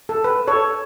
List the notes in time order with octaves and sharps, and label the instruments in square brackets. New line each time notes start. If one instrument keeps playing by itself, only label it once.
[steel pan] A4
B4
A4 C#5